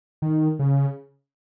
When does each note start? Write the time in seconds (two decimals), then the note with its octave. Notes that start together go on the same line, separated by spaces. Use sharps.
0.22 D#3
0.59 C#3